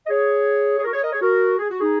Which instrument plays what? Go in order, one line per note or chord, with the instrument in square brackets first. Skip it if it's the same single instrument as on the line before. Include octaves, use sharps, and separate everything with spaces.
[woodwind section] D#5
G#4 C#5
G#4
F#4 A#4
G#4 C#5
A#4 D#5
G#4 C#5
F#4 A#4
G#4
F#4
D#4 G#4